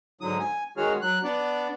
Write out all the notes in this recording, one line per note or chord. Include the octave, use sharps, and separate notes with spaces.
G#2 D3 F#3 D#6
G#5
D#3 G#3 F#4 G#4 C#5 F6
F#3 F#6
B3 D4 D5